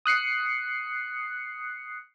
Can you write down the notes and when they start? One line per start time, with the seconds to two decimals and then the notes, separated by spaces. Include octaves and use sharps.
0.06 D#6 F#6 C7 C#7